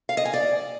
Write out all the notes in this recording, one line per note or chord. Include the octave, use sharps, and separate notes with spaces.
F5
D#5
G#5
D5